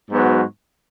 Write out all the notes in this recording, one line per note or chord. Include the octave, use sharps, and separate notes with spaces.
G#2 F#3 B3 F#4